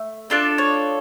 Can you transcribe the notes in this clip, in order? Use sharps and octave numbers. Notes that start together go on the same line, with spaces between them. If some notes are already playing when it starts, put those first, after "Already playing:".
Already playing: A3
D4 F4 A4 D5
C#5